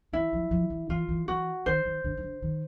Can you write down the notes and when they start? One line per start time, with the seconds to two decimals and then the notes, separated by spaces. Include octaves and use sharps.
0.13 E3 E4
0.33 F3
0.51 F3
0.70 E3
0.89 E3 F4
1.09 E3
1.28 E3 F#4
1.66 D#3 C5
1.85 D#3
2.04 D3
2.17 D#3
2.23 D3
2.42 D#3